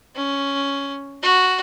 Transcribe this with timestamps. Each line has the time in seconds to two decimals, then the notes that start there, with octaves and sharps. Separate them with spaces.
0.15 C#4
1.23 F#4